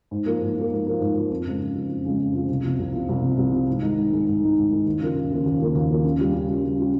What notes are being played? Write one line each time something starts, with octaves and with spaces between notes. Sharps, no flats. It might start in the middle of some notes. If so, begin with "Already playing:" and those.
G#2
F3 A#3
G#2
F3 A#3
G#2
F3 A#3
G#2
F3 A#3
F2
C#3 F3 G#3
F2
C#3 F3 G#3
F2
C#3 F3 G#3
F2
C#3 F3 G#3
C2
C3 F3
C2
C3 F3
C2
C3 F3
C2
C3 F3
G#2
D#3 G#3 D#4
G#2
D#3 G#3 D#4
G#2
D#3 G#3 D#4
G#2
D#3 G#3 D#4
D#2
C#3 F3 A#3 F4
D#2
C#3 F3 A#3 F4
D#2
C#3 F3 A#3 F4
D#2
C#3 F3 A#3 F4
C#3
G3 C#4 F4
C#3
G3 C#4 F4
C#3
G3 C#4 F4